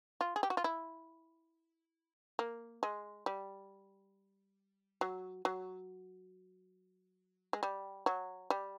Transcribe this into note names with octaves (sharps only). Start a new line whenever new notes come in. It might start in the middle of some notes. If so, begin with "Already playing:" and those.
F4
G#4
G4
F#4
F4
E4
A#3
G#3
G3
F#3
F#3
G#3
G3
F#3
G3